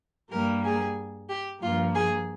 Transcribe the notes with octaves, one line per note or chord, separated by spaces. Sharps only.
G2 G3 A#3 A#4
G#4
G4
G2 F3 A#3 F4
G#4